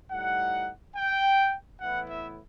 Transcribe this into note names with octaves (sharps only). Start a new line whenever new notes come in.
A2 G3 D#4 F#5
G5
A2 E3 B3 E4 F#5
E5